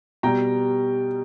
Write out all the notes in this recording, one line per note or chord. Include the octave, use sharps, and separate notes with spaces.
B2 G3 G5 A#5